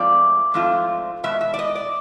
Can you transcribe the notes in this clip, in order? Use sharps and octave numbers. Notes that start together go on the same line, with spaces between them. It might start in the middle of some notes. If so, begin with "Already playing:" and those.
Already playing: G#2 F3 A3 C4 F4 D5
G#2 F3 A3 C4 F4
B2 G#3 E5
E5
D5
D#5
D5